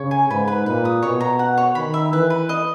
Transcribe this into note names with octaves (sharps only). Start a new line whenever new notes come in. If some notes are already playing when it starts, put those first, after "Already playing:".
Already playing: C#3 C#5
G#5
G#2 B4
B4
A#2 B4
D#6
B2 C#5
A#5
F#5
C#5
D#3 B5
E5
E3 B4
B4
D#5